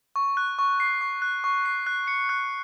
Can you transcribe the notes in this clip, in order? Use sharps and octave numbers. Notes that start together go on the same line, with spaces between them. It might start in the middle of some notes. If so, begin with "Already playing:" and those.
C#6
F#6
C#6
C7
C#6
F#6
C#6
C7
F#6
C#7
F#6